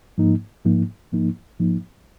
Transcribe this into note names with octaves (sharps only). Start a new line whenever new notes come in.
G#2 F3 A#3 D#4
G#2 F3 A#3 D#4
G#2 F3 A#3 D#4
G#2 F3 A#3 D#4